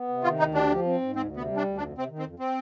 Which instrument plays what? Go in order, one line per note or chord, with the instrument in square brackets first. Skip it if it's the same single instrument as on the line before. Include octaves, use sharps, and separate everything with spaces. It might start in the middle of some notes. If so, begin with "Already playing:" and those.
Already playing: [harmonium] B3
C3
[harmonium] D#3 [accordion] F4
[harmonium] D2 [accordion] D#4
[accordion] D4 [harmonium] G4
[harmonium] F3
C4
G#2
[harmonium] D2 [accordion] C4
[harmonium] C3
[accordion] B3
[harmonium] G3
[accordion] D4
[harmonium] D2
[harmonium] F2 [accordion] D4
[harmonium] C3 [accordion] C4
[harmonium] D#3
[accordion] C4
[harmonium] F2
[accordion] C4